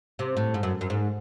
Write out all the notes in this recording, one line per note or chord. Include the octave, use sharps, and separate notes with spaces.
C3
A2
G#2
F#2
F#2
G#2